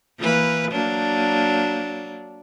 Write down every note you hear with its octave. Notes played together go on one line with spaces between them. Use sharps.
E3 A#3 B4
F#3 A#3 D4